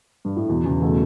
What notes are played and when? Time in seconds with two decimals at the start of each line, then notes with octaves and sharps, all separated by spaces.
0.25 G2
0.36 A2
0.49 E2 B2
0.65 E2 C#3
0.82 B2 A3